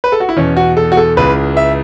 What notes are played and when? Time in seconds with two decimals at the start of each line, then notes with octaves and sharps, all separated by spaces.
0.04 B4
0.12 A4
0.20 F#4
0.29 E4
0.37 E2 B2 C#4
0.57 F#4
0.77 A4
0.92 F#4
0.97 A4
1.17 C#2 C#3 E3 B4
1.57 E5